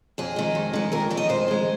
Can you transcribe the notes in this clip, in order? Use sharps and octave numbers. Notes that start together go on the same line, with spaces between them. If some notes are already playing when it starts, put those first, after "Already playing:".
F2 G#4
D#3 G#3
F2
D#3 G#3
F2 A#4
D#3 G#3
D#5
F2 C5
D#3 G#3